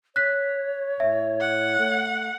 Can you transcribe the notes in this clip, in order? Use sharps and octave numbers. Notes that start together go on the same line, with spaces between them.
C#5 F#6 B6
A2 E5
F#5
A3